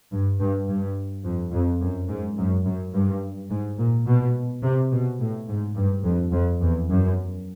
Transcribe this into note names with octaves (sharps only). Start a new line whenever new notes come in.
G2
G2
G2
F2
F2
F#2
G#2
F#2
F#2
G2
G#2
A#2
B2
C3
B2
A2
G#2
G2
F2
F2
E2
F#2